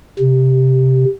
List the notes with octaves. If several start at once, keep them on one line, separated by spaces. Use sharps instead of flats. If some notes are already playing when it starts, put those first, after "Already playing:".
C3